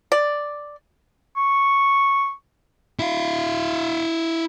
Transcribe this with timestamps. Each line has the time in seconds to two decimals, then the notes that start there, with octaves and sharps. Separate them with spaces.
0.12 D5
1.37 C#6
2.99 E4 F5